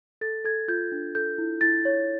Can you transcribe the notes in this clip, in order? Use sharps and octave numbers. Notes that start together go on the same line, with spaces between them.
A4 A6
A4 G#6
F4 G6
D4
A4 G6
E4
E4 A6
C#5